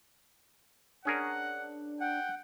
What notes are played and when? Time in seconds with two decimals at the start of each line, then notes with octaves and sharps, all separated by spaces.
1.05 C#4 D4 G#4 A#4 F#5
2.01 F#5 G5